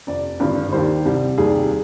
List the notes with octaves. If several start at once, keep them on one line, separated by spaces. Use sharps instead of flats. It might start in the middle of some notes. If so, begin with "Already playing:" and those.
F1 F2 C3 D5
G#1 G2 D3 F3
D#2 D#3 G3 C5
C2 C3 G3
F1 D#2 D#3 G3 G#4